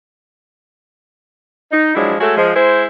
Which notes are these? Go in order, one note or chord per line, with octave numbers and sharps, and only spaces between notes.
D#4
F3 F#3 G#3 D4 E4
G#3 A3 F#4 A4 C#5
F3 G#3
G#3 E4 C5